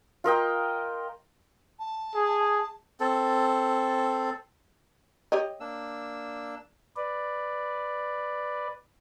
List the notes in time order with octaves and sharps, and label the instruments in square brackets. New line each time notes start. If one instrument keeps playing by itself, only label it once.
[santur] F4 A#4 D#5 G5
[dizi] A5
[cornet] G#4
[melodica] C4 A4
[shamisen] G4 C#5 D#5
[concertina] A#3 D4 E6
[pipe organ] B4 D5